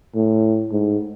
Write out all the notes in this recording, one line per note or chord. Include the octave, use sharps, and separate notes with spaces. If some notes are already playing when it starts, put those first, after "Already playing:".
A2
G#2